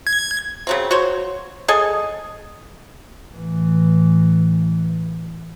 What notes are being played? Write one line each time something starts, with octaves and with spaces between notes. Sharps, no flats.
G#6
C#3 F#3 C4
F#4 C5 C#5
G#4 A4 D#5 G#5
A2 E3